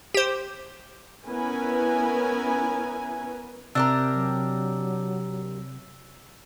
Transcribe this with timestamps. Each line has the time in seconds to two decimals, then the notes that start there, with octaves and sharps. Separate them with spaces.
0.14 G4 C5
1.27 B3 C#4 E4 A#4 B4 G#5
3.75 C3 D4 G4 A#4 E6
4.14 F#3